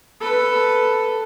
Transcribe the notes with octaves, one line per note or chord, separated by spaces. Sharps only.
A4 B4